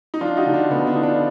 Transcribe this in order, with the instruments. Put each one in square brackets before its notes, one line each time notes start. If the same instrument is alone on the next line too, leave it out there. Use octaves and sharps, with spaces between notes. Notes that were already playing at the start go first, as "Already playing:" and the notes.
[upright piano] D#4
F3 D4 F4
D#4 F#4
D2
D4
D2 B3
D4
D3 D#4
D4 F4